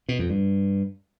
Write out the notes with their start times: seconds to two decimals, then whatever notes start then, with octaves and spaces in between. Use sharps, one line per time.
0.09 B2
0.19 F2
0.30 G2